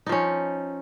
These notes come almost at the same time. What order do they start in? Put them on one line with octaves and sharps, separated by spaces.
D#4 F3 C#4